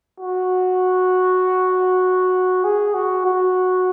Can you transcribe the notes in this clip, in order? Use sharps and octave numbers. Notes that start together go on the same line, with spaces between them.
F#4
G#4
F#4
F#4